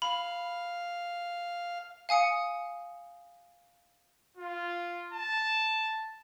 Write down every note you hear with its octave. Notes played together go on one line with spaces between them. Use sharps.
F5 B5
F5 G#5 D#6 C#7
F4
A5